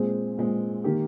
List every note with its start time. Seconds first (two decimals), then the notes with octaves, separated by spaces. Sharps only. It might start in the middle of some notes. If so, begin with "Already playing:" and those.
Already playing: A#2 G#3 C4 G#4
0.37 A#2 G#3 C4
0.84 D#3 A#3 G4